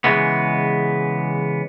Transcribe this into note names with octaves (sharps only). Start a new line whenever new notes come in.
C#3 E3 G#3 B3